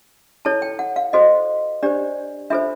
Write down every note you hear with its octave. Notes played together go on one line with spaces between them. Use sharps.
E4 A4 C#5 A5
G5
F#5
F5
F#4 A4 C5 D#5
D4 G4 C5 D5
D4 F4 A4 C5 E5